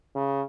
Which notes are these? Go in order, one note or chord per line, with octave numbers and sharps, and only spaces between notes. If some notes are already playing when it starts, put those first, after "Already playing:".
C#3